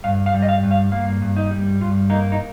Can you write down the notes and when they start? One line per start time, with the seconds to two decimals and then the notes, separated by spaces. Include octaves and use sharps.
0.04 G2 F5
0.26 F5
0.34 G3
0.42 D#5
0.49 F5
0.63 G2
0.71 F5
0.92 A#3 F5
1.22 G2
1.37 D#4
1.51 G3
1.81 G2 F4
2.10 A#3 D#4
2.32 D#4